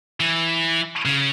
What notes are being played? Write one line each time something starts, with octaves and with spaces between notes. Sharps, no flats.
E3
C#3